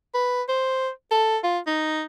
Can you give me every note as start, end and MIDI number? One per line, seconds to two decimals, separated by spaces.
0.14 0.42 71
0.49 0.89 72
1.11 1.38 69
1.44 1.59 65
1.67 2.03 63